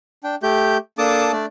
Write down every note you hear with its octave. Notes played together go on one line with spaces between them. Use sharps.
D4 G5
A3 G4 G6
A#3 D4 A4 A5 D6 D#6
A3 D4 D5